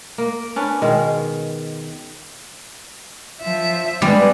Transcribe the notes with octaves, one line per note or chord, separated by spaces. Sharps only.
A#3
C#4 D4 B4
B2 D#3 G#3
F3 E5
G3 G#3 B3